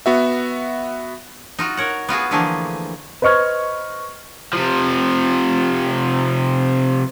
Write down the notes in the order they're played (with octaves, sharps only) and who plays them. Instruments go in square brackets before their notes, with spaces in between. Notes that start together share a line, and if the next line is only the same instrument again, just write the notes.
[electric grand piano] B3 F#4 E5
[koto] D#4 F4 F#4
A#4 C#5 F#5
B3 F4 F#4 G#4
D3 E3 F3 A3 A#3 G#4
[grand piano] B4 C5 D#5 C#6 F6 G#6
[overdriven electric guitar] C3 F3